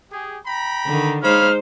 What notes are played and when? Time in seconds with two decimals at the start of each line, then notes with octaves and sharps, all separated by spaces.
0.12 G4 G#4
0.46 G5 A#5 B5
0.86 D3 D#3
1.23 G#3 D#4 C5 C#5 F5 B5 F6